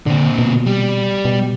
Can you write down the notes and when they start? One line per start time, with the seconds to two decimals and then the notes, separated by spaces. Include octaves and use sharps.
0.06 A#2 D3 C4
0.39 B2
0.66 G3
1.25 B2